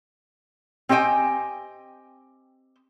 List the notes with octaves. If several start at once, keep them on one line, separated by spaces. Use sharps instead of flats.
C4 G4 D#5 G5 G#5